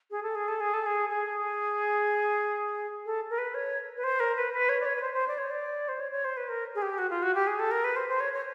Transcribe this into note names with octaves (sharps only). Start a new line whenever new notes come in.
G#4
A4
G#4
A4
G#4
A4
G#4
G#4
A4
A#4
B4
C#5
B4
C5
A#4
B4
B4
C#5
D5
C#5
B4
C5
C5
D5
C#5
D5
C5
C#5
C#5
C5
B4
A#4
G#4
G4
F#4
F4
F#4
G4
G#4
A4
A#4
B4
C5
C5
C#5
C#5